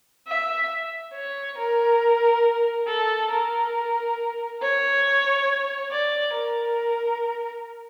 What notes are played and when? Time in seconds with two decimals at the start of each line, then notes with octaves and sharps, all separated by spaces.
0.27 E5
1.14 C#5
1.57 A#4
2.87 A4
3.31 A#4
4.62 C#5
5.91 D5
6.34 A#4